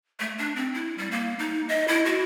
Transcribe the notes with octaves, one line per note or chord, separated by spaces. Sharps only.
A3
D4
C4
E4
G3
A#3
D#4
D#5
E4
F#4